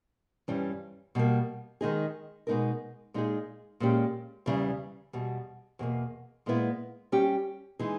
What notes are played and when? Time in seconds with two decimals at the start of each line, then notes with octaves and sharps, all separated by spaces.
0.48 G2 E3 G3 C#4
1.15 B2 G3 A#3
1.81 D#3 G#3 D#4 G#4
2.47 B2 G#3 B3 D#4 A#4
3.14 A#2 G#3 D#4 G#4
3.80 A#2 G#3 C#4 G4
4.46 E2 C#3 E3 G3
5.13 E2 B2 G3
5.79 E2 B2 A#3
6.46 A#2 G#3 B3 E4
7.12 G3 C#4 G4
7.79 E3 G#3 D#4 G#4